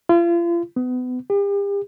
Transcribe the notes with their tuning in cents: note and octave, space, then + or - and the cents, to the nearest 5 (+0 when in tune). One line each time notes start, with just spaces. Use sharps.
F4 -40
B3 +30
G4 +40